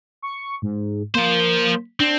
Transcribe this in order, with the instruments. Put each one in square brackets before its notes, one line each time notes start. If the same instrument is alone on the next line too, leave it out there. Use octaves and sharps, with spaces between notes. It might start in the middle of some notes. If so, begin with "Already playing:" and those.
[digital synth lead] C#6
G#2
[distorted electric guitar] F3 C5 [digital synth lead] A#3
[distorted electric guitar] C4 [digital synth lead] D4